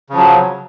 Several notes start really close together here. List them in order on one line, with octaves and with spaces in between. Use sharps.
C#3 F3 F#3